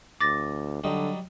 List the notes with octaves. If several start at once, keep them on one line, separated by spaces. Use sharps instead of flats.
D2 D6 A6 A#6
D3 F#3 G3 D#4